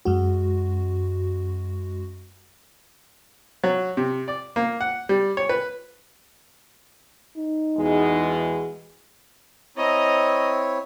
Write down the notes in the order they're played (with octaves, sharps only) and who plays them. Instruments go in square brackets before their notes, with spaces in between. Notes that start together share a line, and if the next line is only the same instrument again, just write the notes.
[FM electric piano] F#2 G#3 F#4
[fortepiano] F#3
C3
D5
A#3
F#5
G3
C#5
B4
[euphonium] D#4
[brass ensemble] E2 B2 G#3
[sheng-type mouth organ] C4 E4 C#5 [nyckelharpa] D#5 A#5